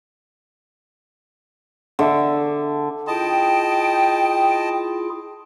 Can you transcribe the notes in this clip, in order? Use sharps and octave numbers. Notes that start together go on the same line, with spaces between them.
D3 E5
E4 F4 G#4 D#5 G5 A5